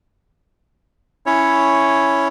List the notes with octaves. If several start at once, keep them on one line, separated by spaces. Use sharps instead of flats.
C#4 E4 C#5